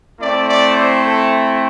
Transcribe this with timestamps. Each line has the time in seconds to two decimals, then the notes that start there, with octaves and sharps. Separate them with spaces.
0.19 A3 C4 E4 D5
0.48 D5
0.76 C5
1.05 A4